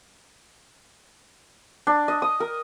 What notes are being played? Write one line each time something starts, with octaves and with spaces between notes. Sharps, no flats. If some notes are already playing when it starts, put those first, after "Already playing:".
D4
D#5
D#6
A#4